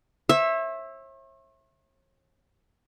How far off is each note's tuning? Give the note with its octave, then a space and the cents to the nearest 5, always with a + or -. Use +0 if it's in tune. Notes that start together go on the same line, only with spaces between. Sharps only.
C#5 -45 E5 +0